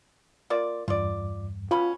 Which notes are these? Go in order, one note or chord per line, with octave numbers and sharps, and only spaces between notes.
A#3 F4 D5
E2 G2 F4 D5
B2 C#4 F4 B5